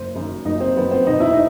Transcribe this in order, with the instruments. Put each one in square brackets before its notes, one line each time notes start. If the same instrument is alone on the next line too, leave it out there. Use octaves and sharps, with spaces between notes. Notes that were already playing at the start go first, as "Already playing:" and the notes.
Already playing: [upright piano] F#1 C5
F#2 D#3
F#1 D#4
C4
F#2 D#3 B3
C4
E1 D#4
E4
D#4